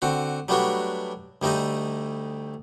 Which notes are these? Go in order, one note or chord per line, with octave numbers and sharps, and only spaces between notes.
D3 C4 F#4
F#3 G3 A3 B3 D4 F#4
D2 G3 A3 D#4 D#5